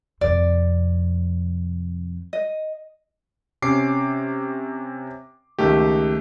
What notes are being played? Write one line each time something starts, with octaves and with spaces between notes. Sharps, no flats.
F2 C3 D5
D#5
C3 C#4 D6 C7
C#2 D#3 A3 G4